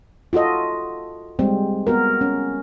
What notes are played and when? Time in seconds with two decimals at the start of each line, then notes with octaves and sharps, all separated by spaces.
0.33 F4 F#4 A4 D#5
1.39 G3 G#3 C4
1.87 B3 F#4 A#4
2.21 C#4